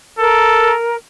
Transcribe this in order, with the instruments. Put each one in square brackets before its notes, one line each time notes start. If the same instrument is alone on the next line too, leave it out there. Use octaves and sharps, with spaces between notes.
[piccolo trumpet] A4 [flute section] A#4